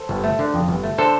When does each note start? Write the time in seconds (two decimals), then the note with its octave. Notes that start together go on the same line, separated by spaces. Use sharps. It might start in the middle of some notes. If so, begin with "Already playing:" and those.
Already playing: A4 C5
0.09 G1
0.24 A3
0.39 D3
0.54 F2
0.68 G1
0.83 A3
0.98 D3 A4 C5